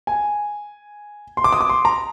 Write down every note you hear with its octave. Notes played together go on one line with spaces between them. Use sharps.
G#5
C6
D6
D#6
D6
C6
A#5